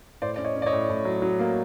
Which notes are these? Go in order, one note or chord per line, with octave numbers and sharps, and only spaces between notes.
A2 C5 D5
C#4 D5
C#5 D#5
C#4
D5
C#5 D#5
A2
A2
F#3
F#3
A#3